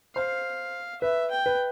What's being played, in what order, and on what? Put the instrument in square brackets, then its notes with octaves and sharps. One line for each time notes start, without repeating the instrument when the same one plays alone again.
[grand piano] C5 [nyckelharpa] F5
[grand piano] B4 [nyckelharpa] E5
[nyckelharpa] G5
[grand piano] B4